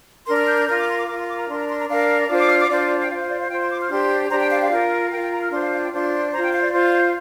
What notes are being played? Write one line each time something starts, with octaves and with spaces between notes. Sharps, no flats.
D4 A#4 C6
F6
G6
G6
F4 A#4 F6
D6
C6
D6
F4 A#4 D6
C6
D6
A#5
D4 A#4 C6
A#5
C6
A#5
D4 A#4 F5
D4 F4 C5 D6
D6
F6
D6
D4 F4 C5 D5
G5
F4 C5 F5
F5
D5
F5
F4 C5 G5
C6
D6
F6
D4 G4 C5 C6
D4 G4 C5 A#5
G5
F5
F5
F4 A#4
F4 A#4 G5
G5
A#5
F6
D4 F4 C5 C6
F5
F5
G5
D4 F4 C5 C6
F4 C5 A#5
G5
F5
D5
F4 C5